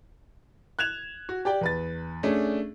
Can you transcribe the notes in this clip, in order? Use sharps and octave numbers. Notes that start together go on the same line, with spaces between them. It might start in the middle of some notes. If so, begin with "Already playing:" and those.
F#6 G#6 E7 F7
F#4
G4 D5 G5
E2 B4 A6
A3 C#4 D4 G#4